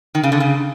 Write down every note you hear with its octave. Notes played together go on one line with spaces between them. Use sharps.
D#3
C#3
D3
C#3